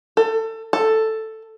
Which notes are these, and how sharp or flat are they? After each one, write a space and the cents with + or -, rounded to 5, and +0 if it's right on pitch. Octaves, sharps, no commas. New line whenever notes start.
A4 +25
A4 +5